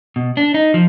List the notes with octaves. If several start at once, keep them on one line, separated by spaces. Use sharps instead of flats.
B2
D4
D#4
F3